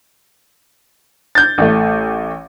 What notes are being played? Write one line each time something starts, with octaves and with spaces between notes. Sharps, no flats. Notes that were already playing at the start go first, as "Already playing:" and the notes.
G6 A6
A1 A3